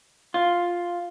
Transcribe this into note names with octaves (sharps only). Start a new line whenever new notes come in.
F4